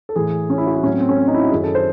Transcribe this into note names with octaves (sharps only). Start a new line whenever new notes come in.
A4
A2 E3 G#4
C#4
E4
F#4
E4
A2 F#3 C4 C#4
C4
C#4
C4
D#4
E4
F#4
F#2 D#3 F#3 G#4
A4
C5